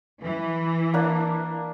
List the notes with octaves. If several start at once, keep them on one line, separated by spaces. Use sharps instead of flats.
E3
A#3 D4